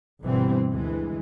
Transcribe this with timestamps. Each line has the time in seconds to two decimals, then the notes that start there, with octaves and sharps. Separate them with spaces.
0.23 G1 B2 E3 G3 C4
0.72 D2 E3 G#3